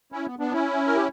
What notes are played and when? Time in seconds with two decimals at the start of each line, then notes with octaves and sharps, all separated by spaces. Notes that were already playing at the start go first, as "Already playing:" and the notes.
0.12 C#4 E4
0.26 B3
0.39 B3 D4
0.52 C#4 E4
0.87 A#4
0.96 G4